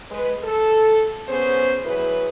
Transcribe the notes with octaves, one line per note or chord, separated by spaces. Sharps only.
G#3 B4
A4
B3 C#4 G#4 C5
F#3 E4 G#4 B4